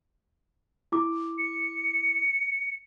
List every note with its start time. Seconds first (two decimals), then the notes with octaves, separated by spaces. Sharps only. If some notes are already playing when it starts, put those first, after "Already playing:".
0.92 E4 D6
1.38 C#7